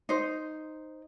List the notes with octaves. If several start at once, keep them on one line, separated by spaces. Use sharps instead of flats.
D#4 C5